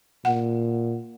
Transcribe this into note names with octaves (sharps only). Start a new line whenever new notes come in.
A#2 F#5